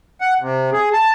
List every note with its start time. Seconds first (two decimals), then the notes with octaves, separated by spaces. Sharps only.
0.21 F#5
0.41 C3
0.73 G#4
0.93 A5